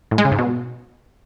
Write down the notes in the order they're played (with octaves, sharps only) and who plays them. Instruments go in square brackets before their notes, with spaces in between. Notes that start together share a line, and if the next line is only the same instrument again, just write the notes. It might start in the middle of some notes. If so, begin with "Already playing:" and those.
[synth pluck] A2
G#3
C#3
G#2
B2